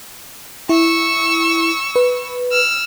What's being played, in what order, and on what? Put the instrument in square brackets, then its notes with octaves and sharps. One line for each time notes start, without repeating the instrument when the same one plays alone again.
[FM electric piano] E4 [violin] C#6 E6
[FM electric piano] B4
[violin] E6 F6